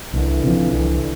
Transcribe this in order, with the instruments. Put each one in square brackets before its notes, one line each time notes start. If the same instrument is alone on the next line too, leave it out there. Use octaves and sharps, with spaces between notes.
[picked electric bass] C2 [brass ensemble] D3 E3
[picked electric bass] C3 F3
C2